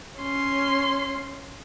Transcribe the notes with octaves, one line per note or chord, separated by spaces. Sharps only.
C#4 C6